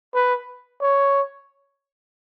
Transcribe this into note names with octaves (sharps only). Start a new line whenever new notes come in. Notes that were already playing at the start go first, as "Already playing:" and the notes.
B4
C#5